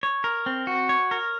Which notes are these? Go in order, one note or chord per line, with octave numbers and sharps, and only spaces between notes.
C#5
A#4
C4
F#4
C#5
A#4